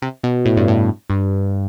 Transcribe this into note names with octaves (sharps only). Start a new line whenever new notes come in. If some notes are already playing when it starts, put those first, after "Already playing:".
C3
B2
A2
G2
A2
G2